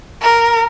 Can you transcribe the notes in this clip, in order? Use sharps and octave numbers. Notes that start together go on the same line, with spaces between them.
A#4